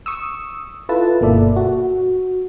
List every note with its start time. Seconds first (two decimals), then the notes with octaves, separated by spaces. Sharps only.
0.06 C#6 D#6 E6
0.89 E4 F4 A4 B4 A5
1.21 G1 B2 A#3 A4 D5 E5
1.56 F#4